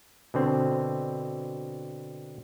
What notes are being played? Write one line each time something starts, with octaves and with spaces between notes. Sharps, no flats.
B2 D3 C4